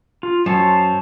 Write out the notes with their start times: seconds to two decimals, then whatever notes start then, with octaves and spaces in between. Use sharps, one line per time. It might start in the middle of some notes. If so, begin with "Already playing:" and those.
0.23 F4
0.46 F#2 C5 C#5 A5